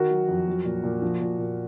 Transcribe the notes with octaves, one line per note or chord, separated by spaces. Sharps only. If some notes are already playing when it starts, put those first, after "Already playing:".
Already playing: D#3 F#4 A#4
F#3
F2
F#3
A#2
A#2
F3
A#2
A#2